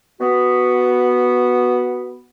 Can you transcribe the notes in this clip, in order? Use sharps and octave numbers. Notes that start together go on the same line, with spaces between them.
B3 F#4